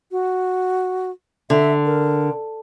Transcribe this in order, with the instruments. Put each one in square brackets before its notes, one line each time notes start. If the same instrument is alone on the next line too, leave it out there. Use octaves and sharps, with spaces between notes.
[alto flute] F#4
[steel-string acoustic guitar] D3 [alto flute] E5
[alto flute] A#4